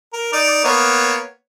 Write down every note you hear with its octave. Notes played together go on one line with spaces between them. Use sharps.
A#4
D#4 D5
A#3 B3 C#5